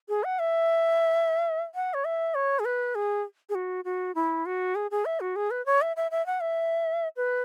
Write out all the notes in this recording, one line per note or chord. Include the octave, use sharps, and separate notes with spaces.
G#4
F#5
E5
F#5
C#5
E5
C#5
G#4
B4
G#4
G#4
F#4
F#4
E4
F#4
G#4
G#4
E5
F#4
G#4
B4
C#5
E5
E5
E5
F#5
E5
B4